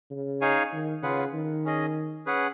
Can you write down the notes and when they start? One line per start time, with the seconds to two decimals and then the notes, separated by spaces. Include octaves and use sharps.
0.11 C#3
0.41 D#4 G#4 C#5 F5 G#5
0.73 D#3
1.03 C#3 F4 G#4 B4 F#5
1.34 D#3
1.65 C#4 G#4 D#5
2.26 C#4 G#4 B4 F#5